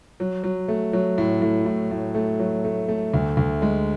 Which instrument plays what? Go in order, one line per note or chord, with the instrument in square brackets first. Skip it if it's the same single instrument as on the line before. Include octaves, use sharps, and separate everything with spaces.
[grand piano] F#3
F#3
A3
F#3
A2
A2
A2
A2
A3
F#3
A3
A3
D2
D2
G#3